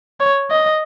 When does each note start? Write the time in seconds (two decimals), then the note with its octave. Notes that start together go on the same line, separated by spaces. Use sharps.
0.20 C#5
0.51 D#5